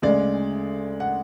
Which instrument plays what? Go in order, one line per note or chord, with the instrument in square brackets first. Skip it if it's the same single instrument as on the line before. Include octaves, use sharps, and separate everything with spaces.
[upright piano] D2 C#3 G#3 D5
F#5